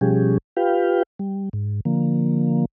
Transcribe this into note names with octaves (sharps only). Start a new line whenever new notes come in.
B2 F3 G3 C#4 G4 G#4
F4 G4 B4 F5 G5
G3
G#2
D3 F3 A#3